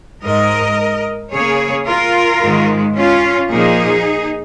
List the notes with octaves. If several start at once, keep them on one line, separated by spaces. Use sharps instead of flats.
G#2 G#3 A#4 D#5
C#3 A#3 G#4 C#5
F4 A#4
G#2 D#3 G#3
C#4 F4
A#2 F3 A#3 D#4 G#4